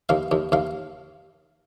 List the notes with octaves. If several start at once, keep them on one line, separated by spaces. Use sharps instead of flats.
D#2 F5
D#2
D#2 F5